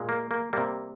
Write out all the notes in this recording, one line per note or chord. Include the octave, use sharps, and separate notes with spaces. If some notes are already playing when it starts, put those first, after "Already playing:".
Already playing: A#2 G#3
A#3
A#3
C3 G3 A#3